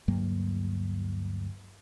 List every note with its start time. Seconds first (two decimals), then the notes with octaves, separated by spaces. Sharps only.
0.08 D2 G2 F#3 A#3